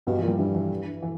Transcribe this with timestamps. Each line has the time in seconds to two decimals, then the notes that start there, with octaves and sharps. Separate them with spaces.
0.07 G2 B2 G3
0.17 E3
0.22 A#2
0.28 G2 G3
0.38 G2 E3
0.55 E3
1.02 E3